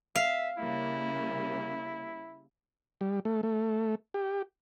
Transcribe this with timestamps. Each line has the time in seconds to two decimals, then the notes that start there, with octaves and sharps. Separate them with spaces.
0.16 E5 F5
0.58 C#3 G3 A#3 E4
3.01 G3
3.25 A3
3.43 A3
4.14 G4